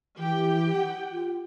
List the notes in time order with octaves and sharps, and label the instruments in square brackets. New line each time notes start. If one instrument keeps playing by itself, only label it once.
[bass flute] E3 [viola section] G4 G5
[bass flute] F#5
F4